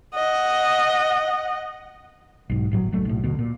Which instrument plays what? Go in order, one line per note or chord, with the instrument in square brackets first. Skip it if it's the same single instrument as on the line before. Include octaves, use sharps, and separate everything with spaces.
[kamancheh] D#5 F#5
[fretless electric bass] B1 G#2
G1 A2 F#3
F#1 F#3 A3
B1 A2
D2 B2
A#2